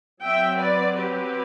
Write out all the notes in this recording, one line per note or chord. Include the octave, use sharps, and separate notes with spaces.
F#3 C4 E5 G5
B4 D5
G4 B4